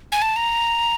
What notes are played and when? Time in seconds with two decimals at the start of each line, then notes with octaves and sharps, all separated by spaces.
0.12 G#5
0.22 A5
0.36 A#5